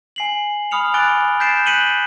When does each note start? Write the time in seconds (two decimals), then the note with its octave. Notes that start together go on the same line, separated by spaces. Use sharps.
0.16 G#5 C7 F#7
0.71 B5 D#6 F6 C#7 F7
0.94 G#5 D6 F#6 A6 D7 G7
1.40 G6 A6 B6 C7 D7 E7
1.66 F#6 B6 C#7 D#7 F#7 G7